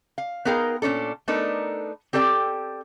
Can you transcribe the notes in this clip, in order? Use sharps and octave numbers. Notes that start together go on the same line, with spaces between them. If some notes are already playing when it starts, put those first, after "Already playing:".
F5
B3 D#4 G#4 A#4 F5 G5
A#2 F#3 C#4 D4 A4
A3 B3 D4 D#4 A4 A#4
C4 G4 A4 D5 G5